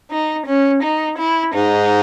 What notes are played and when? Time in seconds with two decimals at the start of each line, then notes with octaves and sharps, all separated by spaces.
0.12 D#4
0.47 C#4
0.83 D#4
1.19 E4
1.55 G#2 D#4